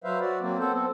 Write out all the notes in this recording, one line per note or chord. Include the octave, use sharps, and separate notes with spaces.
F#3 B4 C5 E5 F5
F#4 D5
F#3 A#3 C4
B3 C4 A4 C5
C4 A4